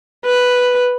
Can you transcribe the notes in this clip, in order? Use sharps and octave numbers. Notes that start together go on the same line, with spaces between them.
B4